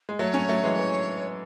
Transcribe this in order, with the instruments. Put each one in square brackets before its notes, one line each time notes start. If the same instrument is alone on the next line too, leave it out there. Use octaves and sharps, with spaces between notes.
[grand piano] G#3
[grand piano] F#3 A3 [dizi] C#5
[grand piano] A3 C#4
F#3 A3
E3 G#3
E3